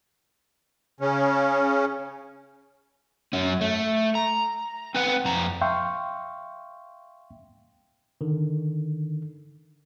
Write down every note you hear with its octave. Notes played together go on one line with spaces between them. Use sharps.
C#3 C#4
F#2 C#4
A3
A#5
C4 B4 F#5
F2 A#5
E5 F5 G5 C6 C#6
D3 D#3